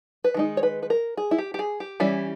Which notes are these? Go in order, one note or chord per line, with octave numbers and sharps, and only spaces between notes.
B4
D#3 G#3 D#4
C#5
B4
B4
A#4
G#4
E4
G4
G4
G#4
G4
E3 G3 C#4 E4